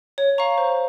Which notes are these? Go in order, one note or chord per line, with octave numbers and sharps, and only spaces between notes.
C#5
F5 A#5 C#6
C5